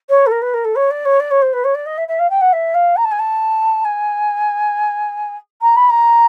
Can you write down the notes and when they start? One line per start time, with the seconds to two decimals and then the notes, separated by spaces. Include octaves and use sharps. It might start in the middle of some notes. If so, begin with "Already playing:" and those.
0.09 C#5
0.26 A4
0.31 A#4
0.42 B4
0.54 A#4
0.64 A4
0.76 C#5
0.90 D5
1.05 C#5
1.20 D5
1.31 C#5
1.42 C5
1.53 B4
1.64 C#5
1.75 D5
1.86 D#5
1.98 E5
2.08 E5
2.19 F5
2.30 G5
2.41 F#5
2.53 E5
2.74 F5
2.97 A#5
3.04 A5
3.12 G#5
3.19 A5
3.85 G#5
5.62 A#5
5.76 B5
5.90 A#5